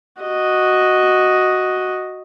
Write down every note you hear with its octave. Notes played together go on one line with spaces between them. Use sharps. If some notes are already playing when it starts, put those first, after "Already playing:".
F#4 D#5